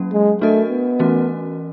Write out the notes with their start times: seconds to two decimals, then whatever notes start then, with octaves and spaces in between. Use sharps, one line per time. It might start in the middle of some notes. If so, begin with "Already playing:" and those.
Already playing: F#3 A#3 C#4
0.13 G#3
0.41 A3 D4 F#4 A#4 D#5
0.70 B3
0.99 E3 A3 C#4 F#4 A#4